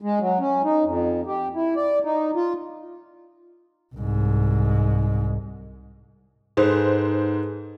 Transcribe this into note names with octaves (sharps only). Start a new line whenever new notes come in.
G#3
F#3
C#4
D#4
F2
G4
E4
D5
D#4
F4
C2 G#2
G#2 G#4 A4 B4 C5